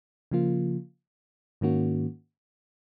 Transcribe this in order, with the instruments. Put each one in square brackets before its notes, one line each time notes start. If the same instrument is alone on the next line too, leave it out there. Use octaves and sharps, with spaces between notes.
[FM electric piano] C#3 F3 A#3 F4
G#2 D#3 A#3 C#4 F#4